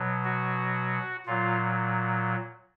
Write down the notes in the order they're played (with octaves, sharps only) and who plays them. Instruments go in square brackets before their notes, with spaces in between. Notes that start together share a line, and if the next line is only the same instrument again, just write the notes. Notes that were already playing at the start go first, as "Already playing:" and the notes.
Already playing: [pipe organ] B2 F#3
F#4
A#2 F#3 F4